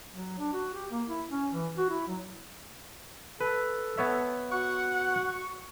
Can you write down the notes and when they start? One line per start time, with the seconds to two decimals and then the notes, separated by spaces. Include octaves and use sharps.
0.12 F#3
0.38 D4
0.52 F#4
0.74 G4
0.91 A#3
1.07 E4
1.30 C#4
1.52 E3
1.77 F#4
1.89 E4
2.07 F#3
3.41 A4 B4
3.97 B3 C#5 E5
4.51 F#4 F#5 C#6